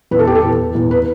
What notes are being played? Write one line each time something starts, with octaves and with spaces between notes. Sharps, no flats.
E2 B4
A4
G4
A4
E2
E2
B4